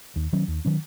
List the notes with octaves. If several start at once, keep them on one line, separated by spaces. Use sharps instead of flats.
D#2
D#3 F#3 C#4
D#2
D#3 F#3 C#4